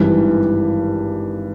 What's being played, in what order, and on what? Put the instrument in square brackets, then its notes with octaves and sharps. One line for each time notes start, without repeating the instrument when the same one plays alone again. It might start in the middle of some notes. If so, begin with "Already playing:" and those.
Already playing: [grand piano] G#1 G2 E3 G3